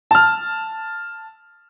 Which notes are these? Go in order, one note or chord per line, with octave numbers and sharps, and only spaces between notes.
A5 F6